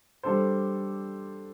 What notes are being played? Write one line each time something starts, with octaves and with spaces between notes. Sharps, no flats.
G3 D4 A4 C5